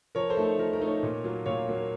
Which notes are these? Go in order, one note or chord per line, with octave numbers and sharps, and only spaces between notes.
F3 A#4 C#5
A4 C5
A3 D#4
A4
F3 A#4
A#4
A3 D#4
A#4 C#5
A#2
F#3 A#3 F4
A#2 C#5 F5
F#3 A#3 F4